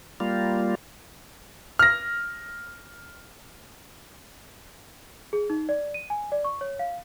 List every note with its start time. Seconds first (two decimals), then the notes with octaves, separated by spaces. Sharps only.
0.20 G3 A#3 F4
1.79 F6 A#6
5.33 G#4
5.50 D#4
5.69 D5
5.94 D#7
6.10 G#5
6.32 D5
6.44 C#6
6.61 C#5
6.79 F5